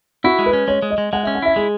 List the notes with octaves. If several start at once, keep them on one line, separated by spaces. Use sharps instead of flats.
E4 F#4
G#3
B4
C#4
G#3 C#5
G#3
D#5
G#3
G#3 F#5
E5
C#4
F#5
E4 E5
G#3 G#4